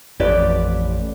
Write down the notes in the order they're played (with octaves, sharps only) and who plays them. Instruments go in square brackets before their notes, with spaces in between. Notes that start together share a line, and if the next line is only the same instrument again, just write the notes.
[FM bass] A1 [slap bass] F2 [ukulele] G4 B4 D5